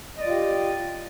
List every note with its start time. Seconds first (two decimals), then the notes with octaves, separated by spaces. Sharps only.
0.16 D#5
0.20 D5
0.24 F4
0.29 G4